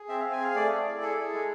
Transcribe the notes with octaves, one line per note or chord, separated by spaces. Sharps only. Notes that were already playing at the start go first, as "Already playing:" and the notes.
Already playing: G#4
C4 E5
C4 F5
G#5
G#4 F5
A3 D5
G#4
E4
G#4 A4
G#4
G#3